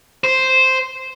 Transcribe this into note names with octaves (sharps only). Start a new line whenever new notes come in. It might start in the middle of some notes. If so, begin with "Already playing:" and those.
C5